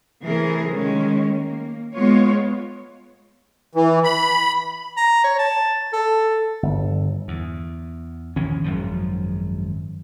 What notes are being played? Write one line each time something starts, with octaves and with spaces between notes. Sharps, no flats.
C3 E3 A3 G#4 A#4
D#3 G#3 C#4
A#3
G#3 B3 F4 C#5
E3
B5
A#5
C#5
A5
A4
G1
E2
A#1 D#3 E3 C#4
G#1 F#2 F3